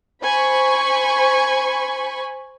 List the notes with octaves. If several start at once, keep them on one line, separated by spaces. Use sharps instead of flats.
C5 G#5 B5 C#6